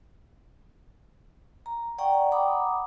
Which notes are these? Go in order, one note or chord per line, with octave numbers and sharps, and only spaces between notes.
A#5
D5 F#5 G5 A#5 C#6
F#5 A#5 B5 D6 D#6